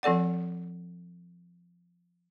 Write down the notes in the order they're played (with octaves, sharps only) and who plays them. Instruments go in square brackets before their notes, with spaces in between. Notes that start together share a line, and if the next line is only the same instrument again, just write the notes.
[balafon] F3 C4 A4 D5 F#5